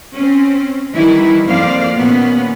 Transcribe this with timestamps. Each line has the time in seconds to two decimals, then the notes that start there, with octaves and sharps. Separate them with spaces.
0.14 C4 C#4
0.95 D#3 E3 G3 E4
1.46 F2 F3 A#3 C5 D5 F5
1.96 D#2 A#2 B3 C#4